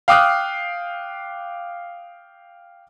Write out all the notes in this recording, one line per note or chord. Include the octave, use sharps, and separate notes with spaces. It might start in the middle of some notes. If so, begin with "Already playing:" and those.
F5 G5 D6 D#6 F6 F#6